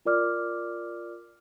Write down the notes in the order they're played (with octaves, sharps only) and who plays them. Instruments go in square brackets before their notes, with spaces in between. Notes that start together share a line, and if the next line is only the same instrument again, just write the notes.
[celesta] F4 A#4 D5 D6 F6